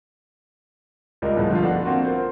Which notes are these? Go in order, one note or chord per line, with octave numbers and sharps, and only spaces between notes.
C#2 G3 F4 A#4 D#5
G1 A2 F3 G#3 A5
D3 F3 F4
A3 B3 D4 F#4
A#3 C4 F4 F#4 A#4
A#4 C5